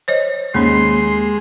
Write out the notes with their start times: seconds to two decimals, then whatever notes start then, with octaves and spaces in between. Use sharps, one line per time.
0.08 C5 C#5 D#5
0.54 D#2 G#3 A#3 C#4 C6